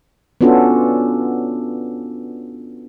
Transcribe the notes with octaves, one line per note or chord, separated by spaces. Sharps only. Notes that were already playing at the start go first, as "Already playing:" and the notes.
B3 C#4 D4 F4 F#4 A4